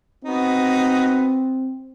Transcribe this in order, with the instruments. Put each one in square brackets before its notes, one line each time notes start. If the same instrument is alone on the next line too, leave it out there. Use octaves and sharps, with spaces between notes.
[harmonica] B3 D#4 F#4 [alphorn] C4